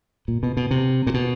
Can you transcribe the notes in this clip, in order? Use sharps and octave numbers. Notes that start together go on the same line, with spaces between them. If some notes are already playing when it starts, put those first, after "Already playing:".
A#2
B2
B2
C3
A#2
B2